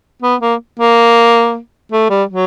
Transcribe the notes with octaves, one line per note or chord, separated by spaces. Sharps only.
B3
A#3
A#3
A3
G3
F#3